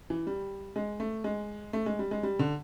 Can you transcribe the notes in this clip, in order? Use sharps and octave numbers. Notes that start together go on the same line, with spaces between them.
E3
G3
G#3
A3
G#3
A3
G#3
G3
G#3
G3
D3